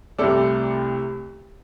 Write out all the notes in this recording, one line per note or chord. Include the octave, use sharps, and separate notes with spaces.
C2 C3 A3 A4 D5